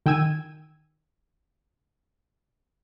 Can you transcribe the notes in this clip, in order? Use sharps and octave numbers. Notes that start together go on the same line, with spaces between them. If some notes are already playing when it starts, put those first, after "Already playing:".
D#3 G5 G#5 E6 G#6 D#7